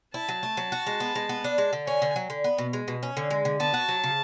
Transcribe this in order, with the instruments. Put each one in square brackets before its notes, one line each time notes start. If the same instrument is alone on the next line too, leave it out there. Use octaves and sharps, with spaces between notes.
[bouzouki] E4 [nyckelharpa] A5
[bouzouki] F#3
A3
F#3
F#4
G#3
B3
G#3
B3
D4
G#3
D3
[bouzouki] C#4 [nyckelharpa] G#5
[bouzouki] D3
F#3
D3
B3
B2
G#3
B2
C#4
D3
G#3
D3
[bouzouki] B3 [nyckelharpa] A5
[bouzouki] F#4
F#3
C#3